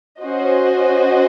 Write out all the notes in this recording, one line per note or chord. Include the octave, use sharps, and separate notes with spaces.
C#4 F#4 C5 D#5